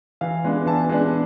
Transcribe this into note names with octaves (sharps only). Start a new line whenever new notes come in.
E3 F5
G#3 B3 D4
E3 A5
G#3 B3 D4